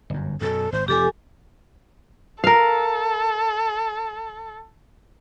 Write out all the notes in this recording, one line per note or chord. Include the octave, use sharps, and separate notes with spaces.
G1 F#2
F#2 B2 A4
G#1 C5
F1 G#2 F3 G4 A4 G#5 D6
A4 A#4 F5